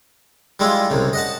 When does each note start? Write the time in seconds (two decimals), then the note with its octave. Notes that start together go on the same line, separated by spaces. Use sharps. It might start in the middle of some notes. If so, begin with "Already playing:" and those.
0.59 G3 G#3 E4 F4
0.90 C2 C#3
1.13 D#5 F#5 A5